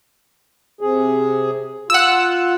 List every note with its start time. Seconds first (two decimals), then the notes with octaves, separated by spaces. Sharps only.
0.81 C3 G#4
1.90 F4 F#5 E6